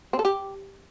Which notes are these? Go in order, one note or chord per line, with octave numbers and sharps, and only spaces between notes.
C4
A4
G4